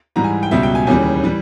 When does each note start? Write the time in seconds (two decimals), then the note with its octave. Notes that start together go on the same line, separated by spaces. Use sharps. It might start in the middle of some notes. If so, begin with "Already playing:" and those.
0.16 G#2 E3 G3 A#5
0.24 G#5
0.43 G5
0.51 C#2 B2 G3 E5
0.63 G5
0.75 G#5
0.87 D#2 C#3 E3 G3 G#5
1.23 E3 G3